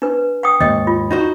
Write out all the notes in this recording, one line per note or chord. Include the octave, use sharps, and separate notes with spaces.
D4 B4
F#5 G5 D#6
D#2 G#2 D#5 G5
F4
D#4 F#4 C5